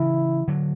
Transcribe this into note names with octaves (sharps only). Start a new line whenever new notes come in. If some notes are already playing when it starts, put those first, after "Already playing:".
Already playing: C#3 E3 E4
D3 F#3